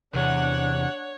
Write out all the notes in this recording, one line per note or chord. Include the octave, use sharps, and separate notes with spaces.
E2 C3 D4 C#5 F#5